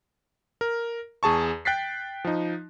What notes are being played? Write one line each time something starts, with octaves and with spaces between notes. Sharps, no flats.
A#4
E2 G#4 A5 C#6
G5 F#6 A6 B6 C7
F3 D#4